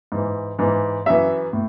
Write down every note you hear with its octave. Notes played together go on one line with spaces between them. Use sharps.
G#2 E3
G#2 E3
F#2 E3 E5
A2